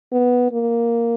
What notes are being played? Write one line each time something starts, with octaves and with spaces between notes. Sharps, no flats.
B3
A#3